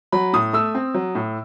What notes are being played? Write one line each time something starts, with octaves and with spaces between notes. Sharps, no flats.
F#3 B5
A2 D#6
A3 E6
C4
F#3
A2